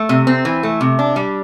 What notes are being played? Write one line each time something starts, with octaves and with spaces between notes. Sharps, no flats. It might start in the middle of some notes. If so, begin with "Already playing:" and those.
Already playing: A3
C3
C4
E3
A3
C3
D4
G3